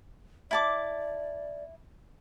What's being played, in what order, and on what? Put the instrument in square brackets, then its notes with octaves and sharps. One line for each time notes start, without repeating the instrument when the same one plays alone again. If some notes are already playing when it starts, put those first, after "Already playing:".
[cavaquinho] E4 A5 D6 [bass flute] D5